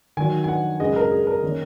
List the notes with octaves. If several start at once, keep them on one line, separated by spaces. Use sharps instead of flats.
D#3 F#3 D#4 G#5
G#5
F#5
F#2 C#3 G#3 D#5
A#4
G#4
A#4
D#3 A#3 C#4